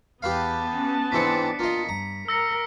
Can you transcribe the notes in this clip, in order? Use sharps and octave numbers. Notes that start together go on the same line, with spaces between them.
E2 B3 G4 B4 F5 A5
C#4
G#2 E3 C4 D4 B6 C#7
A#3 F4 D#5
G2 A#5
A#4 E6 A#6 C#7